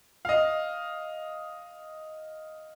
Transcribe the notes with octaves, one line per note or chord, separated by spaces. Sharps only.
D#5 F5